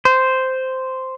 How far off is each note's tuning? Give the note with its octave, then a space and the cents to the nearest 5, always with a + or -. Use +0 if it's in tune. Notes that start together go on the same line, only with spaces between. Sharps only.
C5 -5